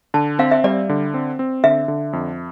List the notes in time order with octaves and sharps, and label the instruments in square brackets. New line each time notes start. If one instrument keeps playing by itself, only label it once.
[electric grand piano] D3 [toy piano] A5
[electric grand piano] C4 [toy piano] F5
[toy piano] E5
[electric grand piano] G3 [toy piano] D5
[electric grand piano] D3
C4
C4
[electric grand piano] D3 [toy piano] E5
[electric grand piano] D3
F2